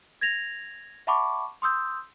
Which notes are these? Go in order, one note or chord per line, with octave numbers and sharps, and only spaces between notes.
G#6 A#6 F7
E5 F#5 A5 B5 C#6 D6
C6 D#6 E6 G6